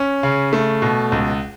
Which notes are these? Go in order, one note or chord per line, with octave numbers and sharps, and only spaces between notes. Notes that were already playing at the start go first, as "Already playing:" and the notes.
Already playing: C#4
C#3
A3
B2
C#2